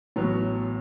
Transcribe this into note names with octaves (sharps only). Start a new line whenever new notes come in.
A1 A2 F#3 B3